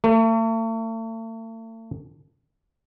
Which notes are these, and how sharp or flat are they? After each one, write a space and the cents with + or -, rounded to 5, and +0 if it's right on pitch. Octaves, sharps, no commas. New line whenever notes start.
A3 +40